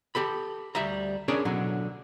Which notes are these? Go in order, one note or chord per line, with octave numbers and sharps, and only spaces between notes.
G4 A4 B5
D2 G3 E5 A#5
C#4 D4 G#4 A#4 C#5 D5
B2 D3 F#3